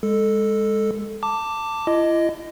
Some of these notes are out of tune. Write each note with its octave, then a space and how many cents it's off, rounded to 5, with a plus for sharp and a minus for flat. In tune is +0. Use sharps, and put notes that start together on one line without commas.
G#3 -15 A4 +0
A5 +20 D6 +0
E4 +40 D#5 +0